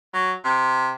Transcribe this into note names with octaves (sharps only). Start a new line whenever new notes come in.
F#3
C3